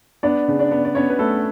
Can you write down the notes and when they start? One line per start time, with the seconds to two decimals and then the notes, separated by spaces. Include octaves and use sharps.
0.23 B3 D4 D5
0.48 C#3
0.59 D4 D5
0.71 B3
0.85 D5
0.95 B3 C#4 C#5
1.10 B4
1.18 A3 B3 A4